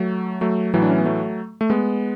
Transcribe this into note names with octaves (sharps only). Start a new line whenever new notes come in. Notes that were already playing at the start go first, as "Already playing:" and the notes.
Already playing: F#3 A3
F#3 A3
A2 E3 F#3 A3
D4
C#4
B3
F#3 A3
A3
G#3 B3